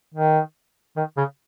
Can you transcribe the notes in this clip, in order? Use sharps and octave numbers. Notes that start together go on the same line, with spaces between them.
D#3
D#3
C#3